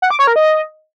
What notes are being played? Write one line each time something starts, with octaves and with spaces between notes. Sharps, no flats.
F#5
D6
C#5
A#4
D#5